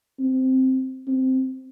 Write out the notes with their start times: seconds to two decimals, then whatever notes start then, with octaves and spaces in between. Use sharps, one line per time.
0.20 C4
1.07 C4